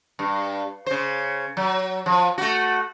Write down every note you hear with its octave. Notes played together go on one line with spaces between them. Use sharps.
G2
C#3 C5
F#3
F3
A3 F#4